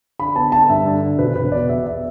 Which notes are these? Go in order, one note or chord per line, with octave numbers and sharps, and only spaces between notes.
D3 B5
B3 A5
D3 A5
G2 E5
D3
D3
E1 B4
E1 B4
B2 D5
E2 E5
B2 E5